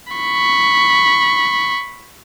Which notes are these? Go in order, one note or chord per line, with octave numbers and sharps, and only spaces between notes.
B5 C#6